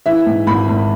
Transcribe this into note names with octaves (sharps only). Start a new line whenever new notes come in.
E3 E5
G#2
G#1 B5
G#1